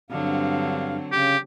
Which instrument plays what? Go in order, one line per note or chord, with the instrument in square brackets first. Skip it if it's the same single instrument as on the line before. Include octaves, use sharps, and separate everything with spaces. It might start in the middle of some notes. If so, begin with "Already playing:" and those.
[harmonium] G2 F5 [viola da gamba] D3 F#3 C4
[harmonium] C#3 [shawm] G4